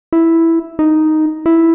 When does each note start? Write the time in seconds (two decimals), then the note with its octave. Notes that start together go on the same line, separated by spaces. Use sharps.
0.13 E4
0.79 D#4
1.46 E4